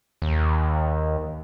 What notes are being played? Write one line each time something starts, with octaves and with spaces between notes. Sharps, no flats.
D#2